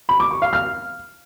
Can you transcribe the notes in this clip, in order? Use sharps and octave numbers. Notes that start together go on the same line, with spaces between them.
B5
D6
C#6
F5
F6